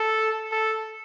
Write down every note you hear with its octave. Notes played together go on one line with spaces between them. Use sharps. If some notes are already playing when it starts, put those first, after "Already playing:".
Already playing: A4
A4